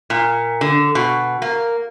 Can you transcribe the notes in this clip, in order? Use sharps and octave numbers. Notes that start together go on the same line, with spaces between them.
A#2
D3
B2
A#3